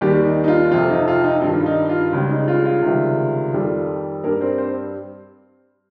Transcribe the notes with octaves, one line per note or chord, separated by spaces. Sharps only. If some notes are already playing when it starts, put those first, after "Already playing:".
D#2 D#3 G3 G4
D#4
D#4
F4
F2 C3 F3 F4
D#4
F4
D#4
G2 D#3 G3 F4
D#4
F4
C#2 C#3 G3
D#4
F4
F4
C#2 C3 D#3 G3
F2 D#3 G3
G2 G3 A#3 A#4
C4 C5
C4 C5